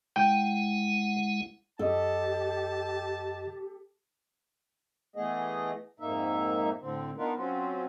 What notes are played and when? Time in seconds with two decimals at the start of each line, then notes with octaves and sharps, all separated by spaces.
0.16 G#3 E4 F#5 G5
1.79 F#2 G4 A4 D#5 A5
5.16 E3 A3 B3 G#4 D#5
6.00 F2 G#2 A#3 D#4 E5
6.81 A2 D3 C4
7.17 B3 D4 D#4 F4 A#4 B4
7.36 F#3 C4 C#4 F4 F#4